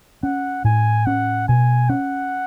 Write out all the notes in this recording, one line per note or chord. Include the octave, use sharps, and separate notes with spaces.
C#4 F#5
A2 G#5
C#4 F#5
B2 G#5
C#4 F#5